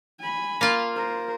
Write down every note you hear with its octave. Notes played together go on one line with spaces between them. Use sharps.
G#5 B5
A#3 F4
A#4 C5